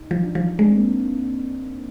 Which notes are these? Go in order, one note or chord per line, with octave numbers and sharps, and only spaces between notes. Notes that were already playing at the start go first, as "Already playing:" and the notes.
Already playing: D#4
F3
D4
F3
G#3 D4
C4
A#3